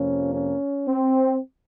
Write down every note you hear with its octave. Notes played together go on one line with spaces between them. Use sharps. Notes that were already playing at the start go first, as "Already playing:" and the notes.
Already playing: F2 C3 F3 A#3 C#4
C#4
C4